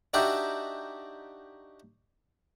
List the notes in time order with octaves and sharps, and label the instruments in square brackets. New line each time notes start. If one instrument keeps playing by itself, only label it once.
[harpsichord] D4 D#4 F#4 G4 D5 E5